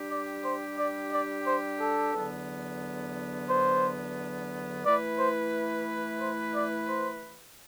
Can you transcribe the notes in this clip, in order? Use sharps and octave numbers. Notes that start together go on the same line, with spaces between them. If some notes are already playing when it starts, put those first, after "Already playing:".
Already playing: G3 D4 G4
D5
C5
D5
D5
C5
A4
E2 D3 F#3 B3 D4
C5
E3 A3 E4 B4 D5
C5
C5
D5
C5